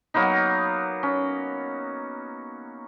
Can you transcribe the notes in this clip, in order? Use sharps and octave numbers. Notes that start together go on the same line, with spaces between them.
F#3 A#3 B3 D#4
C#4